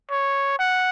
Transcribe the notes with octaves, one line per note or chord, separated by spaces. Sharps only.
C#5
F#5